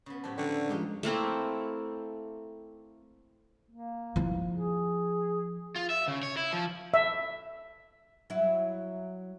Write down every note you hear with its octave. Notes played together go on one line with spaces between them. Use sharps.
C#3 B3
A2 F#3 G4 C5 A5
D3 F3 F#4 D5 F#5 G5
F3 G#3 D#4 G4 F5
A3 A#3 C4 E4
A#3
F3 E4
G#4
F4
E5
C#3
C#5
E4
F3
E5
F#3 E4